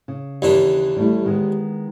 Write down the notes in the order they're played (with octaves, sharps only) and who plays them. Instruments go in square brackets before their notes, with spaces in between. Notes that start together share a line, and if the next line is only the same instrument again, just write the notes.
[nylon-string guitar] C#3
[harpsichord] D#2 E3 D4
[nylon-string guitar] G3 A3 E4
D#3 G#3 B3